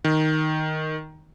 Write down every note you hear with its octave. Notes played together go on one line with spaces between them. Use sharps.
D#3